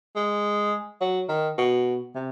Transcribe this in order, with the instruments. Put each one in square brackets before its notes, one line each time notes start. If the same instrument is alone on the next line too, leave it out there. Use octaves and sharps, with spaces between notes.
[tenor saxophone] G#3
F#3
D#3
B2
C3